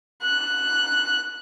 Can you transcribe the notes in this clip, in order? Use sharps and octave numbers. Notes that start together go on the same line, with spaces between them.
F#6